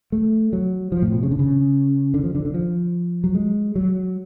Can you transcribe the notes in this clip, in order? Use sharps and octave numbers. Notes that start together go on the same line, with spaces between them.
A3
F#3
F3
A2
B2
C#3
D3
C#3
D3
F3
D3
D3
F3
F#3
G#3
F#3